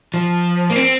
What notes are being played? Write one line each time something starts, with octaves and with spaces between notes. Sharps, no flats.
F3
A#3
C4